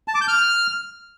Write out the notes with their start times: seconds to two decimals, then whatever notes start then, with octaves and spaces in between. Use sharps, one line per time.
0.08 A5
0.14 D6
0.21 G6
0.28 F6